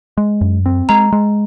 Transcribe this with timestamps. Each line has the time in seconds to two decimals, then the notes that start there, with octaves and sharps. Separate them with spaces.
0.17 G#3
0.41 F#2
0.66 C4
0.89 G#3 A#5
1.12 G#3